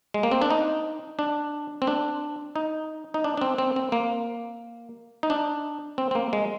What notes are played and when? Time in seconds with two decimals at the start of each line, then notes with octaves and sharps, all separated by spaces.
0.14 G#3
0.23 A#3
0.32 C4
0.42 D4
0.50 D#4
1.19 D4
1.82 C4
1.87 D4
2.56 D#4
3.14 D#4
3.24 D4
3.37 D4
3.41 C4
3.58 C4
3.76 C4
3.92 A#3
5.23 D#4
5.30 D4
5.98 C4
6.11 C4
6.15 A#3
6.33 G#3